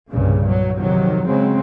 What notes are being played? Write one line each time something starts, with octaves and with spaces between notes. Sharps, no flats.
C2 G2 A#2 C#3
F#3
F2 C3 D#3 F#3
C#3 F#3 G#3 C4